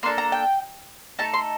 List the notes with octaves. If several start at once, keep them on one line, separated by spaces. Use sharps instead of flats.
A#3 D4 A4 C6
A#5
G5
A3 D#4 A4 A5
C6